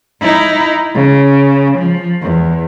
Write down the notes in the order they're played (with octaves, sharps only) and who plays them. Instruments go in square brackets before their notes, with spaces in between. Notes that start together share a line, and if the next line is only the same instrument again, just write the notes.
[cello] D#4 E4
C#3
F3
E2